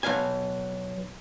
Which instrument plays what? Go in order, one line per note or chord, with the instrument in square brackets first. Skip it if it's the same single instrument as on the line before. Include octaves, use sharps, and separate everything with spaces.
[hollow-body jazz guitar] B1 C3 F5 G#5